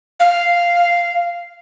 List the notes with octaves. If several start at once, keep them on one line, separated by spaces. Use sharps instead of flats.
F5